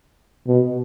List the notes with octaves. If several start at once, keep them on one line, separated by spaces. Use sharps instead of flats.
B2